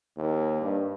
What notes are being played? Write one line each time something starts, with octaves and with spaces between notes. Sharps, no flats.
D#2
G2